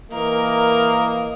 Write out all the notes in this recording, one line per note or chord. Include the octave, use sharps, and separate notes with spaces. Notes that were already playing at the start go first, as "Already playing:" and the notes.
E3 A#3 A#4 D#5